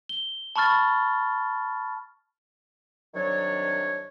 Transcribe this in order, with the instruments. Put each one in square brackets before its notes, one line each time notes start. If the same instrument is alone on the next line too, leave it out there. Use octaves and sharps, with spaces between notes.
[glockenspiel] G7
A5 B5 C#6 F6 A6
[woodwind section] C2 D#3 F#3 D4 C#5